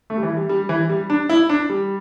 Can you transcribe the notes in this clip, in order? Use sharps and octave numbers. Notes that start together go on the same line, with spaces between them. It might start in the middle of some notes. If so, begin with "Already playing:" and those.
A3
G3
E3
G3
G3
E3
G3
D4
E4
D4
G3